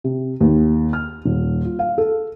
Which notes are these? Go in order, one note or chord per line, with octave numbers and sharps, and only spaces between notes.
C3
D#2
F6
D#1
F4
F5
A4